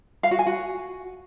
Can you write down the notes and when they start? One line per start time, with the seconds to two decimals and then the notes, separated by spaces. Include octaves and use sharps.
0.23 F5
0.31 F#4
0.39 G#5
0.47 F#4